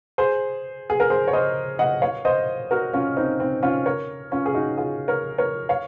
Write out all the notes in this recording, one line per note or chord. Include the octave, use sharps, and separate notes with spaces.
G#4 C5
G#4
A#4
G#4 C5
C#5
C5 D#5
D#5 F#5
C#5 F5
C5 D#5
F#4 A#4
C#4 F4
C4 D#4
C4 D#4
C#4 F4
A#4 C#5
C#4 F4
G#4
D#4 F#4
F4 G#4
A#4 C#5
A#4 C#5
C#5 F5